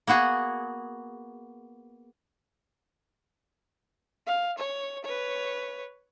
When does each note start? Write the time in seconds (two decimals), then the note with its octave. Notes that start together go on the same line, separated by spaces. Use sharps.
0.07 A#3 B3 F#4 G#4
4.27 F5
4.58 C#5
5.05 B4 C#5